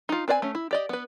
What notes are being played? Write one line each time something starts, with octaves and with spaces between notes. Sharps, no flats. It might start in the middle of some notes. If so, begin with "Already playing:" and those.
D#4 F4
C4 B4 D5 E5 G#5
A3 C#4
E4
G4 D5 D#5
B3 B4